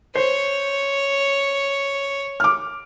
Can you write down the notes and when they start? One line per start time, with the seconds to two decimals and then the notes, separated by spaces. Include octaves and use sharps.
0.15 C5 C#5
2.40 D6 F6